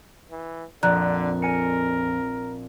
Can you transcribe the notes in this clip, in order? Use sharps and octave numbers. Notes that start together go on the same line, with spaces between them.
E3
A#1 F2 D3 D5 A#5 F#6
A#4 G#5 C#7